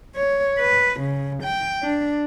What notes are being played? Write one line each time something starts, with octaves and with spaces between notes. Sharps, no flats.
C#5
B4
C#3
G5
D4